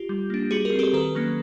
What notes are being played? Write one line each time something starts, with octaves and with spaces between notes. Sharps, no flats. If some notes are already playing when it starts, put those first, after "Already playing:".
Already playing: F4 G4
G3
A#3 D4
G3 F#4 G#4
G#4 A#4
C4
G4 A4
D#3 A4 B4
F#3 A#3 C#4